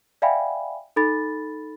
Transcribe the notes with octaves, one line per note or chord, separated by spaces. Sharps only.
D5 E5 F5 G5 G#5 B5
D#4 A4 B5 A6